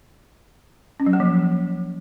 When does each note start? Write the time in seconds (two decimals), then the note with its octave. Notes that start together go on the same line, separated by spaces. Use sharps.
1.00 C#4
1.06 F#3
1.13 A#3
1.20 F3